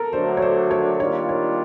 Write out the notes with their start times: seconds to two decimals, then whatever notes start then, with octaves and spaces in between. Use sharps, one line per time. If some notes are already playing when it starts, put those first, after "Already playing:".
Already playing: A4 A#4
0.13 D3 F#3 A3 D4 F#4 C5
0.37 C#5
0.42 C5
0.71 C#5
1.00 D#3 G3 A#3 D4 F4 C#5
1.29 C#5